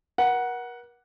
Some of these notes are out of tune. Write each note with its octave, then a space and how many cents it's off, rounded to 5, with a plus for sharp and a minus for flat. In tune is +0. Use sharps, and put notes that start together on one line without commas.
A#4 +40 F#5 +0